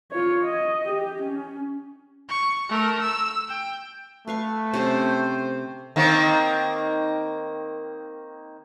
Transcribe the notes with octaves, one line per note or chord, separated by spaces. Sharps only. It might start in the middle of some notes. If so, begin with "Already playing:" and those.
F4 C#5
D#5
G4
C#4
C#6
A3 A#4
E6
G5
A3 B4 F5 C#6
C3 C#4 A4 C5
D#3 A#3 C4